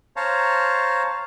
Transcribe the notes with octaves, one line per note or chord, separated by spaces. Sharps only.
C5 C#5 F5 A5 A#5